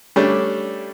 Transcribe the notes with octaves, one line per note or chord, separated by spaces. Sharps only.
G3 A3 C#4 D4